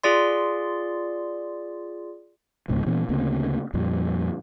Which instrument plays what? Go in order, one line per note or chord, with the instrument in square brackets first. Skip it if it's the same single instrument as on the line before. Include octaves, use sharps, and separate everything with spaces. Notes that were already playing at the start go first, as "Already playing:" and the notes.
[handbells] F4 G#4 D5 C6
[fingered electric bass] C#2 G#2 B2 D3
A#2 E3 B3 C#4
D2 C#3 A#3 C4
F2 A#2 F3 G3